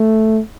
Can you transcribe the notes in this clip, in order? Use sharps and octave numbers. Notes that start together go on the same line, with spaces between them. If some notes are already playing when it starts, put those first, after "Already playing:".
Already playing: A3